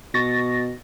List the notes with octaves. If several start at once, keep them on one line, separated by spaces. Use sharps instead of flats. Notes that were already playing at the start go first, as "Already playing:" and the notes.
B2 C#6 A6 A#6